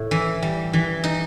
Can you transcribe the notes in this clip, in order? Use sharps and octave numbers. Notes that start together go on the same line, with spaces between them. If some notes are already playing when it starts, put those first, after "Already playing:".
Already playing: A2
E3
G3
E3
D#4